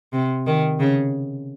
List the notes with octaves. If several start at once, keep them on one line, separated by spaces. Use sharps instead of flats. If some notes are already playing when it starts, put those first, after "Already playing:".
C3
D#3
C#3